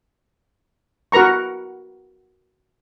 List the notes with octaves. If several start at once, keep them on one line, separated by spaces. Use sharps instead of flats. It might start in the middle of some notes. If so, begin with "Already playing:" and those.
F#4 A#4 B4 A#5 C#6